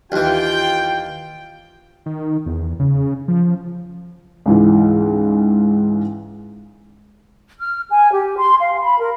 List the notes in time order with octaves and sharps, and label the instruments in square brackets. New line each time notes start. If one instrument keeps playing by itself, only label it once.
[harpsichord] D#2 E3 [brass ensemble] F4 G5
[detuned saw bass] D#3
E2
C#3
F3
[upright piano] C#2 G#2 E3
[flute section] F6
G#5
G4
C6
F5
B5
A#4